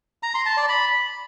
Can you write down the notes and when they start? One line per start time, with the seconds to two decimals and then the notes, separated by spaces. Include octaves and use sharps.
0.23 A#5
0.34 C6
0.46 A5
0.57 D5
0.69 B5